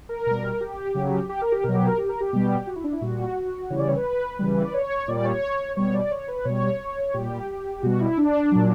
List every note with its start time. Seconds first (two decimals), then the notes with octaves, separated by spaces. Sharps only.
0.09 A#4
0.27 B2 G3
0.61 G4
0.95 C#3 F#3
1.29 G4
1.41 A#4
1.52 G4
1.63 B2 F#3 A#4
1.75 G4
1.86 A#4
1.98 G4
2.09 A#4
2.20 G4
2.33 B2 G3
2.67 F#4
2.76 E4
2.84 D4
2.93 E4
3.01 A#2 G3 F#4
3.70 C#3 E3 G3 C#5
3.79 D5
3.88 C#5
3.96 B4
4.39 C#3 E3 G3
4.65 D5
4.73 C#5
5.08 A#2 G3 D5
5.25 C#5
5.76 B2 G3 C#5
5.94 D5
6.11 C#5
6.28 B4
6.45 B2 G3 C#5
7.14 A#2 G3 G4
7.82 B2 G3 F#4
8.00 E4
8.17 D4
8.52 A#2 F#3